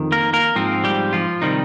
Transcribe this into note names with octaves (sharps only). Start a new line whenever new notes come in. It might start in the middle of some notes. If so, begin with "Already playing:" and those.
Already playing: F2 D#3
A#3 A#4
A#3 A#4
G#2 F3 C4
G3 G4
F3 F4
C3 D#3 G3 C4 D#4